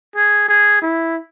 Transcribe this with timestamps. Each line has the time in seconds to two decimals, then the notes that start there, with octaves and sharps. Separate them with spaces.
0.16 G#4
0.48 G#4
0.82 E4